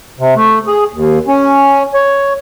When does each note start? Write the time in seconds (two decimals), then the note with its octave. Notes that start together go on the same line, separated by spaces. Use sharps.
0.19 C3
0.36 A3
0.67 G#4
0.93 D#2
1.28 C#4
1.94 C#5